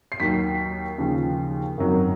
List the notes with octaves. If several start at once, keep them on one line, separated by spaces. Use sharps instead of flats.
C7
D#2 D#3 F#3 B6
D#2 C#3 F3
G#1 F#2 D#3 F#3